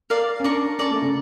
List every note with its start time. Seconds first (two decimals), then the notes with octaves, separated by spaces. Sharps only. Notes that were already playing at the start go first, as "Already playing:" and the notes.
0.10 A#4 D5 F5
0.40 C#4
0.44 D4 A#4 D5 A5 C#6
0.79 C#4 A#4 D5 A5 C#6
0.91 A3
1.02 C#3